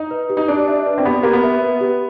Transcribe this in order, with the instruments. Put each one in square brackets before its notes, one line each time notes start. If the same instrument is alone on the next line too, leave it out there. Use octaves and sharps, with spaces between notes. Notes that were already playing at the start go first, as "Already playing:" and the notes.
Already playing: [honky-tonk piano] D#4
[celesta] B4
G4
[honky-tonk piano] D#4
[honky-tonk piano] D4 [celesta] G4
[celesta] E5
B4
[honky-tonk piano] C4
[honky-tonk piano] B3 [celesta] G4
[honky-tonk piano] A#3 [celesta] G4
[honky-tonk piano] B3
[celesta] E5
B4
G4